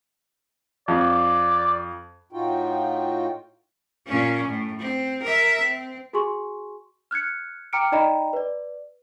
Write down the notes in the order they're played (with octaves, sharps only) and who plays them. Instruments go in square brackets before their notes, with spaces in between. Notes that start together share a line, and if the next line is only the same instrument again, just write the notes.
[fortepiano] F2 [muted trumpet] D5
[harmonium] A2 D#4 F4 F#4 G5
[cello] A#2 C#4
A2
C4
A#4 E5
C4
[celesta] F#4 G#4 G#5 C6 C#6
F6 F#6 G#6 C#7
G5 A#5 D6 F6 C#7 D7
D#4 D5 D#5 G5 A#5 B5
B4 D5